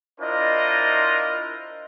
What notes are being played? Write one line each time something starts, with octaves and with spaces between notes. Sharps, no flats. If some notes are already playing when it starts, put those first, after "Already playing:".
D4 E4 F4 A#4 C5 D#5